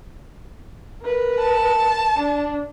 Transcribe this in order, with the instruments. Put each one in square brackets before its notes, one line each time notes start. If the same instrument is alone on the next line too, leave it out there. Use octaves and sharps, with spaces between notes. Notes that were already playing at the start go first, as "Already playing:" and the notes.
[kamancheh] A#4 B4
[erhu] A5
[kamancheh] D4